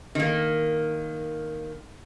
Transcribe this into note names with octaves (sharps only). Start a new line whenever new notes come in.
D#3 A#3